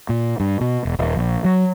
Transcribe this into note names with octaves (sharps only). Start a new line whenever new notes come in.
A#2
G2
B2
E1
D#1
A#1
F#3